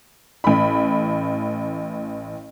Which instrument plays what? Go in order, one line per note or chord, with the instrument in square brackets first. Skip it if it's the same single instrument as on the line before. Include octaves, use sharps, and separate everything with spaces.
[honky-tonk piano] A1 B5